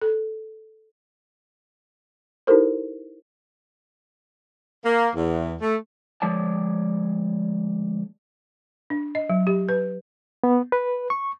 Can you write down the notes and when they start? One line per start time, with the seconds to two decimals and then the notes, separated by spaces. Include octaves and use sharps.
0.02 A4
2.47 D#4 E4 G4 A4 A#4 C5
4.84 A#3
5.16 E2
5.61 A3
6.22 D2 F3 G#3 C#5 D5 A5
8.90 D4
9.15 D#5
9.30 F#3
9.47 G4
9.69 B4
10.44 B3
10.72 B4
11.10 C#6